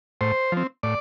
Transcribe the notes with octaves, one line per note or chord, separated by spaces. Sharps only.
A2 C5
F3 C4
A2 D5